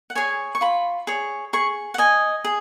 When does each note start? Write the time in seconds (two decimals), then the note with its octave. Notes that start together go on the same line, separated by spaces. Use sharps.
0.10 F#5
0.15 G#4 C#5 G#5
0.55 C#6
0.61 F4 B5
1.07 G#4 C#5
1.53 G#4 C#6
1.94 F#5
1.98 D#5 G#5
2.44 G#4